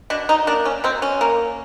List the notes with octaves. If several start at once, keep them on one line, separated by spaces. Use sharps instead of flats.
B2 D4
D#4
A#3 D4
C#4
B2 C4
C#4
A#3